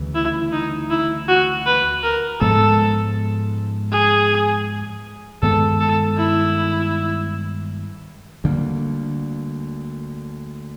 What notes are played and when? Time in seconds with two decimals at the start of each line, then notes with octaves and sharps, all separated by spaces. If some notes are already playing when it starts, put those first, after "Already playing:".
Already playing: D2 C#3 E3 G3
0.15 E4
0.53 D#4
0.90 E4
1.28 F#4
1.66 B4
2.03 A#4
2.41 G#2 F3 G#3 B3 A4
3.92 G#4
5.42 G2 D#3 G#3 B3 A4
5.80 A4
6.18 E4
8.44 D2 D3 G3 A#3